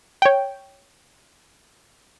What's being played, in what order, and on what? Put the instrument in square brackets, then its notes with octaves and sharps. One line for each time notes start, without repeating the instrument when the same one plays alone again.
[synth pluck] C#5 G5